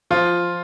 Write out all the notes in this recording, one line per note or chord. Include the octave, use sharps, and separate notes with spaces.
F3 F4